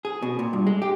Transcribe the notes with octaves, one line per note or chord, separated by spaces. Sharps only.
G#4
B2
A#2
G2
G#3
G4